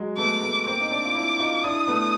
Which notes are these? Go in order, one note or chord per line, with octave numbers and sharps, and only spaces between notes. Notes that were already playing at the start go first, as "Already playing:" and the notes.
Already playing: F#3 G#3
A3 B3 D6
A3 B3
A#3 C4 D6
D#4
C4 D4
F4
D4 E4
D#4 F4
D4 E4 D#6
A3 B3